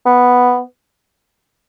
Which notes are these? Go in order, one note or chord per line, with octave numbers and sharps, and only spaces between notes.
B3